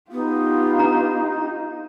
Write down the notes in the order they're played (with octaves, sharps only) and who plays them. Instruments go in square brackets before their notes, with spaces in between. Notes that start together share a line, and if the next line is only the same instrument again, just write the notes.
[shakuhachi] B3 [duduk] D#4 [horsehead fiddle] F4 G4
[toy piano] D4 A#5